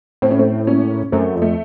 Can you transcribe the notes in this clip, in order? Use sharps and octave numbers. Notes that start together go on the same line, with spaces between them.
A2 C4
C#4
A3 C4
A#3 C#4
F#2 A3 C4
F2
A3